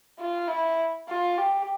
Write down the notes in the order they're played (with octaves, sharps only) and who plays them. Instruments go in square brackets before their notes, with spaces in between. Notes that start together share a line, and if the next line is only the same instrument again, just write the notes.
[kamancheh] F4
E4
F4
G4